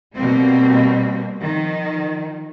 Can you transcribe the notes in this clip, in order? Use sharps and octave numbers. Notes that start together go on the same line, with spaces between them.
B2 G3 A#3 C4
D#3 F3